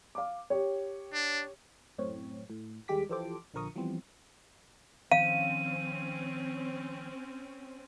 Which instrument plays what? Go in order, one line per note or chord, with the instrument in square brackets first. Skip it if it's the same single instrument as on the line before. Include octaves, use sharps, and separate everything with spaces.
[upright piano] F5 D6
G4 C#5
[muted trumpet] D4
[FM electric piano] F#2 A2 C4 C#5
A2
D#2 G3 G#3 G4 D6 B6
E3 F3 G4 A4 C5 D6
A#1 D3 F3 A#4 C#6 D#6
E3 F3 G3 B3 C4
[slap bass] D#3 F3 [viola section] C4 C#4 [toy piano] F5 [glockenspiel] D#7